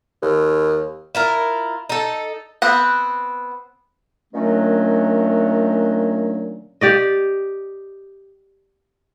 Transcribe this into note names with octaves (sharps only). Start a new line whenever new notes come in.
D#2
E4 F4 A#4
D#4 A4
B3 C4 F#5
A#2 D#3 F#3 A3 C#4 D4
G4 D5 D#5